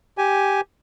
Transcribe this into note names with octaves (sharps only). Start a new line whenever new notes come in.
G4 G#5